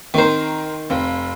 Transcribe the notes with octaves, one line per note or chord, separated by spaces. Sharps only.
D#3 C4 A#4 C5
F1 C4 F5